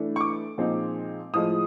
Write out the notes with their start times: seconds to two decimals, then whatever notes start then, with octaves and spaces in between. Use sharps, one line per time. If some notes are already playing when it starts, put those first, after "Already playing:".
Already playing: E3 A3 D4
0.16 C#6
0.21 D6
0.58 A#2 F3 G#3 C4 D#4
1.33 A2 F3 G#3 D#6